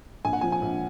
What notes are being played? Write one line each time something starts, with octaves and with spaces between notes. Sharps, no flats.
A#1 G#5
F#5
F3 G#5
G#5
A#1